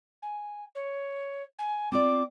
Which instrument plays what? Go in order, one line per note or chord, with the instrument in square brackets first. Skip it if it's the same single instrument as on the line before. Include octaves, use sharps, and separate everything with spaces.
[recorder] G#5
C#5
G#5
[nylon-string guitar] C4 F4 D5 [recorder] D6